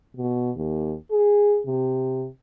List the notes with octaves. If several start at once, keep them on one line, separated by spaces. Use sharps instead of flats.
B2
D#2
G#4
C3